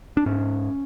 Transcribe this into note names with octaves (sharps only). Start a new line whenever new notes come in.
D4
G#2 C#4